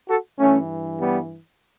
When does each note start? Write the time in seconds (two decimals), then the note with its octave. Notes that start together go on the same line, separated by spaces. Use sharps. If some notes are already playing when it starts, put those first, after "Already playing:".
0.08 F#4 A4
0.38 G2 E3 A3 C#4
1.00 G3 B3